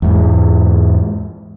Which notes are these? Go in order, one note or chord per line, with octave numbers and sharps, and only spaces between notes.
E2 G#2